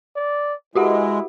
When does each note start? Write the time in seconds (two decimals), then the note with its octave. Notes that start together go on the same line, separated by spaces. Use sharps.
0.16 D5
0.75 G#3 E4 F#4 G4 F#5